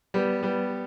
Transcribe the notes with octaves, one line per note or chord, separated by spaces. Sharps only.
G3 B3
G3 B3